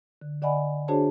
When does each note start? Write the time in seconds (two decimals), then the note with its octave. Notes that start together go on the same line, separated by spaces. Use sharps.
0.21 D3
0.42 D3 D5 D#5 F#5 G#5 B5
0.88 D4 F#4 G#4 C5 C#5 A5